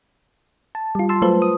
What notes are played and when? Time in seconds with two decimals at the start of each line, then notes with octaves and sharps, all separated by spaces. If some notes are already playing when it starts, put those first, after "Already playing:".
0.75 A5
0.95 G3 F4
1.09 A5 C6 E6
1.22 F#3 A3 F4 B4 C5
1.42 D#6